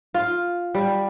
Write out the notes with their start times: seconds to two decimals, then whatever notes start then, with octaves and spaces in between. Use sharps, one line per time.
0.14 F4
0.75 G3